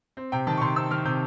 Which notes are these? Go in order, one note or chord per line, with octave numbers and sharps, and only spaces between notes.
C4
C3 G5
D#3 A5
C#6
C3 C6
C4 E6
D#3 F6
C3 G6